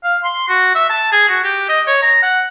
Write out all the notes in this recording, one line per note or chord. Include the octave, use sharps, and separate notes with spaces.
F5
C6
F#4
E5
A5
G#4
F#4
G4
D#5
C#5
A#5
F#5